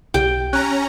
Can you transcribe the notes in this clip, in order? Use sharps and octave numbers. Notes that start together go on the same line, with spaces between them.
B1 G4 G5
C#4 A#5 F#6